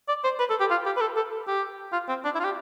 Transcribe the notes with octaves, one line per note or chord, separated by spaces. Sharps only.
D5
C5
B4
A4
G4
F4
G4
B4
A4
A4
G4
F4
C4
D4
E4
F4
G4